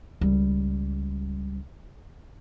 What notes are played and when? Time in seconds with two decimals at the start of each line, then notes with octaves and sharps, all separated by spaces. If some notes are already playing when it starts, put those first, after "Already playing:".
0.21 C#2 G3